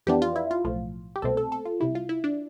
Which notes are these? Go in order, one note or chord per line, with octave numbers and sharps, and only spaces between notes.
F2 E3 B3 D4 G4
F4
E4
F4
B1 A2 F3
G4
C2 B2 A3 C4 A4
A4
A4
F4
C2 C3 G3 E4
F4
E4
D4